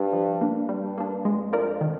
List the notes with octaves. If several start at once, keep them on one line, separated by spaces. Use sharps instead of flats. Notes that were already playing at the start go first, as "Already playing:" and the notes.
Already playing: G2
F3
A#3 D4
G2 G3
A#3 D4
F2 G#3
D4 F4 A#4 D5
D#3